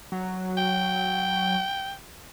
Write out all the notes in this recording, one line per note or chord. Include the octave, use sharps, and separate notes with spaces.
F#3
G5